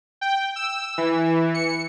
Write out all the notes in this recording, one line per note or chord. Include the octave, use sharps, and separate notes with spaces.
G5
E6
E3
C#7